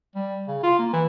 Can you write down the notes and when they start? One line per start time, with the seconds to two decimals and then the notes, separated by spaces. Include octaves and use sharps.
0.15 G3
0.48 C#3
0.63 F4
0.79 A#3
0.93 E3